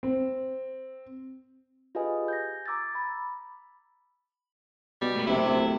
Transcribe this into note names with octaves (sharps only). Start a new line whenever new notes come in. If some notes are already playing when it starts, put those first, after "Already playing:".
C4
F4 G4 G#4 B4 D#5 G#5
G6 G#6 A#6
A#5 D6 E6 G#6 A6
B5
B2 G3
A3 A#3 B5
F#1 C3 E4
D1